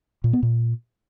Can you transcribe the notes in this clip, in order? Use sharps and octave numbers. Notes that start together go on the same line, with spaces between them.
A#2
B3
A#2